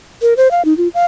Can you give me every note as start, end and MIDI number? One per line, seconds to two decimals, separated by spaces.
0.22 0.34 70
0.37 0.51 72
0.51 0.64 77
0.65 0.76 63
0.77 0.88 65
0.94 1.06 77